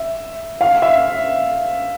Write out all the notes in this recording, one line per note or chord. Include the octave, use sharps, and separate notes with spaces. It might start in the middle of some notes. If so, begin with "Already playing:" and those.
Already playing: E5
F5
E5